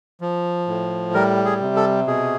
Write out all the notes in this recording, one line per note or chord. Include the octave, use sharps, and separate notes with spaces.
F3
A2
G3 A#4
G#4
C3
A4
B2 G#4